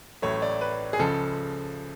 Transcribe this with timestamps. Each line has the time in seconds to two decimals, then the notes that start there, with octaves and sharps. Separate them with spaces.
0.22 A1 A2 F#3 A3 C#5
0.42 D5
0.61 B4
0.93 G#4
0.99 C#2 C#3 F3 A4